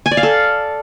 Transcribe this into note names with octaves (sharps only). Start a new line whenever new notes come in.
G#5
D5
F5
A4